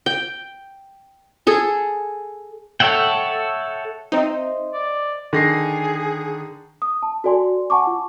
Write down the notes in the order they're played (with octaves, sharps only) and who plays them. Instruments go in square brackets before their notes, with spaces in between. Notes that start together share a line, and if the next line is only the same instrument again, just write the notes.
[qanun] G5
G#4 A4
[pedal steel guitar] A4 C#5 E5 F#5 G5
[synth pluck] C4 D#4 [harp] C5 D#5 E5
[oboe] D5
[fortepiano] D3 [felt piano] D#3 A#6 C7 [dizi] G#4
[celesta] D#6
A5
F#4 A4 D5 G#5 C6
F#5 G#5 A5 C#6 D6
F4